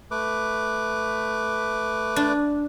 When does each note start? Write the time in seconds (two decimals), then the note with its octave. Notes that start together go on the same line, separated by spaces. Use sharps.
0.11 A3 B4 D6
2.16 D4